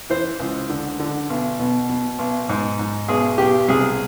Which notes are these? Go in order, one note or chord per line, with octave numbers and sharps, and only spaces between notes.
E3 C5
C#2
D3
D3
B1
B2
B2
B1
G#2
G#2
B1 G#4
B1 G4
C2 G#4